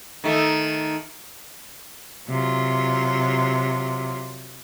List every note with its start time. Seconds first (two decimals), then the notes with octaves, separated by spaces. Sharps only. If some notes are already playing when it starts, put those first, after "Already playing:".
0.24 D#3 A3
2.28 C3 F#3 F4